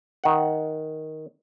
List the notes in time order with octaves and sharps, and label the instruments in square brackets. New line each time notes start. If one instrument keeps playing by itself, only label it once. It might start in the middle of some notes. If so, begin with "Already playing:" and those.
[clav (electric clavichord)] D#3 F#5